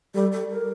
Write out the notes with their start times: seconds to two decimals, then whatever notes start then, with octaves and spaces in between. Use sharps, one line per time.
0.14 G3 A4
0.32 A4
0.50 A#4